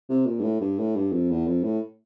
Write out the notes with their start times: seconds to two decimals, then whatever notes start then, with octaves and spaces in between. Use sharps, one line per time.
0.10 C3
0.26 A#2
0.39 G2
0.43 A2
0.61 G2
0.79 A2
0.96 G2
1.13 F2
1.30 E2
1.47 F2
1.64 A2